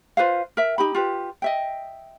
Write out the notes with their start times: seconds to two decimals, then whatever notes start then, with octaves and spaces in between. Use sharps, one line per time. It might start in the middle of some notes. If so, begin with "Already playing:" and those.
0.17 F4 B4 C5 F5
0.57 A#4 E5
0.78 D#4 G4 B5
0.95 F4 G4 B4
1.42 D#5 E5 G5